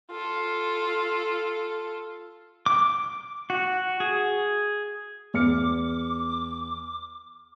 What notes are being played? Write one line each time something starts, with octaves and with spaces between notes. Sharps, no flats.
F4 A4
D6
F#4
G#4
E2 D6 F6 C#7